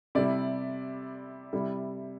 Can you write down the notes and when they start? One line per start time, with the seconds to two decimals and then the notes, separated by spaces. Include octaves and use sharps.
0.15 C3 G3 E4 D5
1.53 C3 G3 E4